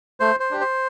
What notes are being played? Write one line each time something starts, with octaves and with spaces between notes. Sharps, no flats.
A3 C5
C5
D4 G4
C5